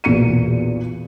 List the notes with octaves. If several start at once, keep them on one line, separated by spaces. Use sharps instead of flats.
B1 E2 A#2 C#7 D#7